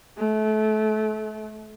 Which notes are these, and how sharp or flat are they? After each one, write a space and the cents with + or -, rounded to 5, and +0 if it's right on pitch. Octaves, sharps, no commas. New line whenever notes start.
A3 -30